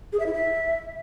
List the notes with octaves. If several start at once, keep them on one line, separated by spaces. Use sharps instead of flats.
G#4
E5
E4
E5